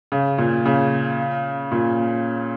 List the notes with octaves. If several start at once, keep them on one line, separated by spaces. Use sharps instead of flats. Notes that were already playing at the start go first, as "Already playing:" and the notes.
C#3
A#2
C#3
A#2